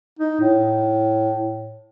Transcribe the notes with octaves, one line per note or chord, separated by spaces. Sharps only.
D#4
A2